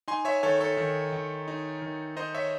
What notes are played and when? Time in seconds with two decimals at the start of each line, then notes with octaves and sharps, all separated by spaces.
0.08 D#4 G#5 C6
0.25 C#5 E5
0.43 D#3 A4 C#5
0.60 A4 C#5
0.77 D#3
1.12 D#3
1.48 D#4
1.82 D#3
2.16 D#4 C5 D#5
2.34 C#5 E5